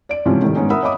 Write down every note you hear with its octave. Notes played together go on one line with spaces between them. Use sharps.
D5 D7
G#2 C3 E3 F3 G3 C#4
A2 D#3 G3
G#2 B3 C#4 D#4
A#4 E5 F#5 B5 D#6 E6
C#5 D#5 E5 B5 D6 D#6